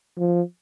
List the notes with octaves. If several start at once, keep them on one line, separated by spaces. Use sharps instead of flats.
F3